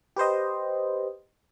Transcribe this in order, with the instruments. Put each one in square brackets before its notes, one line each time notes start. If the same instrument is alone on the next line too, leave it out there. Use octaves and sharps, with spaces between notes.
[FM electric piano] G4 B4 C5 D#5